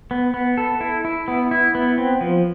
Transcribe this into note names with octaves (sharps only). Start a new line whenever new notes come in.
B3
B3
A4
E4
E4
B3
E4
B3
C4
F3